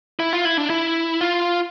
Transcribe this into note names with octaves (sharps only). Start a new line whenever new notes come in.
E4
F4
E4
D4
E4
F4